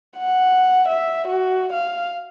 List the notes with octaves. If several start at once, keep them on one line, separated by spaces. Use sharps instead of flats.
F#5
E5
F#4
F5